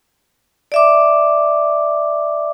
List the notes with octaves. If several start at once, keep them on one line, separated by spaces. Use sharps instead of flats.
D5 E5 D6